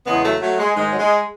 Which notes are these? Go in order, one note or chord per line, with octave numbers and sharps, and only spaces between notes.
E2 C#3 E3 G#3 B3
F#3 A3
F#3 A3
G#3
G#2 D#3 G#3
F#3
G#3